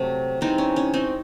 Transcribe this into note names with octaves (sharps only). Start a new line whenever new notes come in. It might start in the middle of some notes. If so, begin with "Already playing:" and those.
Already playing: C3 F#3 A3
C3 E3 G#3 C4 D#4
C#4
C#4
C4 D#4